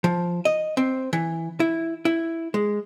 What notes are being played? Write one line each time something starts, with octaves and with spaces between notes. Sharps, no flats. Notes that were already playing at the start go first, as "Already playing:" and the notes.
F3
D#5
C4
E3
E4
E4
G#3